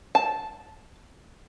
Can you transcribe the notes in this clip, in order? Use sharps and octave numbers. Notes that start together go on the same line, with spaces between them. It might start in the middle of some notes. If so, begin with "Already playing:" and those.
A5